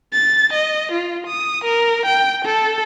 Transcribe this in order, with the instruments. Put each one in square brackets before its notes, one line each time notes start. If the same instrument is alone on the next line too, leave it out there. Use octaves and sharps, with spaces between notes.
[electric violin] A6
D#5
F4
D#6
A#4
G5
A4